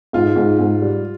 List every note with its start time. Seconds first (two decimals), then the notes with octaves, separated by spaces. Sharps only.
0.13 G#2 F4
0.36 G#2
0.59 G#2
0.82 G3